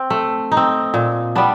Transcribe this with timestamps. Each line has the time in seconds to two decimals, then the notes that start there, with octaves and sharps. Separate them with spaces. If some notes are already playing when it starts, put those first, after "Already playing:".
Already playing: C4
0.10 A3
0.52 D#4
0.57 C4
0.94 A#2
1.36 G3 B3 D4